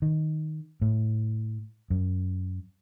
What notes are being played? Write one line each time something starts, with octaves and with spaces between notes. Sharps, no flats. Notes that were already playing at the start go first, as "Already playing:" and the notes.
D#3
A2
F#2